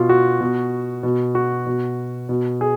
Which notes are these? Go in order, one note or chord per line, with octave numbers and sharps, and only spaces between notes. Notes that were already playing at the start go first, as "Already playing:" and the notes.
Already playing: B2 F4
F#4
B2
B2
F#4
B2
B2
G#4